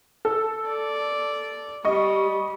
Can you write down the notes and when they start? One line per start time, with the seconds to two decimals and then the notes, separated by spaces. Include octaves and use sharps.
0.25 A4 E6
0.69 D5
1.85 G3 D#5 C#6